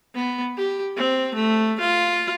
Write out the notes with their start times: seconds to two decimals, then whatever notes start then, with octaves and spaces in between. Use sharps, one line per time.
0.15 B3
0.57 G4
0.97 C4
1.34 A3
1.80 F4